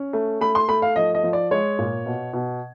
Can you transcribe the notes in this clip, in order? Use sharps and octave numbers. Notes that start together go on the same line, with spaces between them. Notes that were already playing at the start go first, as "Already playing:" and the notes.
Already playing: C#4
A3
A3 B5
C6
A3 B5
F5
F3 D#5
D#5
F3
D5
G#3 C#5
A#2
B2
B2